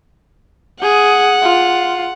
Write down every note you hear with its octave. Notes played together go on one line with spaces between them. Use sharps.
G#4 F#5
F4